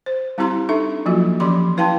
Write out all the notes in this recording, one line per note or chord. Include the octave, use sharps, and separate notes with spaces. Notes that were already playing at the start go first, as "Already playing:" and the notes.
C5
G3 C4 E4 G4 A#5 C6
D4 D#4 A4 E5
F3 F#3 A#3 F4 F#4
E3 F3 C#4 G4 C6 D6
E4 B4 F5 G5 A5 C6